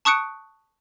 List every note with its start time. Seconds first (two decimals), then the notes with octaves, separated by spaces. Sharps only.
0.05 A5 C#6 D#6 F#6 C#7 D7